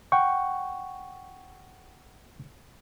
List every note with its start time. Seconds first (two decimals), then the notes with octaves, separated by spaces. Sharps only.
0.12 F#5 G5 C#6